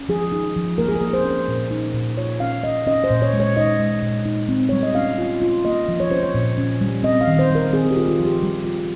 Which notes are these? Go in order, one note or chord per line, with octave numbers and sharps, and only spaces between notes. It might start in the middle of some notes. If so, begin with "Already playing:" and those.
Already playing: C#4
F3 G#4
D#4
F3
A#3 A#4
G#4
A#4
A#3
C5
C#4
C5
A#2
D#4
A#2
F4 C#5
C#4 F5
C#4 D#5
C#4 D#5
C5
A#2
C#5
G#3
C#5
D#4 D#5
G#3
A#2
D#4
C4
G3 C#5
D#5
C#4 F5
F4
F4
A#3 D#5
F3
C#5
C#4 C5
C#5
A#2
C#4
G3
C4 D#5
F5
D#3
C5
G3
A#4
C4 G#4
G4
F4
F4
F3
G4
G3
F4